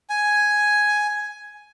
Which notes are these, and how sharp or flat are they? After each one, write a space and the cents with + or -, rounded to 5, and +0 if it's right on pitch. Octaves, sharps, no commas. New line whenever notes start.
G#5 +5